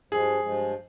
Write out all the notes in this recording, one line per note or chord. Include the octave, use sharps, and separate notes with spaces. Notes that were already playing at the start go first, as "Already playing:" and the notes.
G2 F3 G#3 G#4
G2 F3 G#3